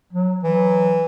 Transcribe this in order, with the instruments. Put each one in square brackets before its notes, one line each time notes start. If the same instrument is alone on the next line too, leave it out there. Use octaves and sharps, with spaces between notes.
[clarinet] F#3
[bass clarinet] E3 [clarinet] F#3